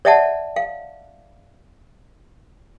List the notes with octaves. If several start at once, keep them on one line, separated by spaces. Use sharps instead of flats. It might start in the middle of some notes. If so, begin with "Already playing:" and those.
C#5 D5 E5 F#5 A5
F5